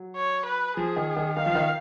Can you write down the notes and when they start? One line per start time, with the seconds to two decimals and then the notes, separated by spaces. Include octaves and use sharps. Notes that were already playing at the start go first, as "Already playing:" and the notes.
Already playing: F#3
0.17 C#5
0.46 B4
0.77 F3 G#4
0.96 D#3
1.17 D#3
1.37 D#3 F5
1.46 F3
1.55 D#3